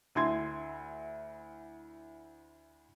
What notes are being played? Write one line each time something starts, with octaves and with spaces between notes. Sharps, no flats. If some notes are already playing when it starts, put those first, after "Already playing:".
D2 E4 C6 G#6